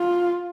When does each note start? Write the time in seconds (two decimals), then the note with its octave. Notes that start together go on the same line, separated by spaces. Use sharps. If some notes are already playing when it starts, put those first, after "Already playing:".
Already playing: F4